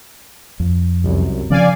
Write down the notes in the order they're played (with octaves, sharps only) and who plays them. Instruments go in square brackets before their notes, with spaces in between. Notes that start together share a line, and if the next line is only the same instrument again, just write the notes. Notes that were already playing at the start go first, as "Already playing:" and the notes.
[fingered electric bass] F2
[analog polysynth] C2 F#2
[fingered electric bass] C#3 F3 C#4 [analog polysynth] D5 F5 G#5